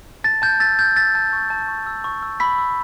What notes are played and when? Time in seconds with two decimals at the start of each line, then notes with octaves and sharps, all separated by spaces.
0.24 A5 A6
0.42 A5 G6
0.60 E6 A6
0.78 E6 G6
0.96 E6 A6
1.15 A5
1.33 C#6
1.50 A5
1.68 C#6
1.86 E6
2.04 C#6
2.23 E6
2.40 B5 E6 B6
2.58 E6